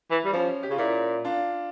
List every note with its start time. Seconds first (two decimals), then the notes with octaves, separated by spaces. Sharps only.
0.11 E3
0.25 G3
0.33 F3 C#4
0.63 G4
0.70 C#3 F4
0.78 A#2 C#4 E4
1.25 D4 F4